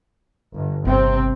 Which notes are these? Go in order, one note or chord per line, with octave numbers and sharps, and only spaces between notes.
G1
G1 C3 C4